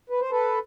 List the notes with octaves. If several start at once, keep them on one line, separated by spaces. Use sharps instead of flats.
B4
C5
A4 B4